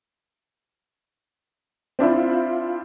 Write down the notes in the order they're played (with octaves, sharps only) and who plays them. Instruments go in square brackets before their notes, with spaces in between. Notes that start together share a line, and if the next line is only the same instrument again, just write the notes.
[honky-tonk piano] C4 D4 E4 F4